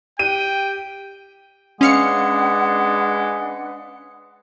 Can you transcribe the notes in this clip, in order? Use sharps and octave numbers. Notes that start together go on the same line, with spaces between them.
G4 G5 D#7
G#3 C#4 D4 B4 F5 F#5 C#7